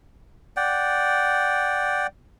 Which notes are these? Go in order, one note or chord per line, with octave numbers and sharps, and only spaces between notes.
D5 F#5 G5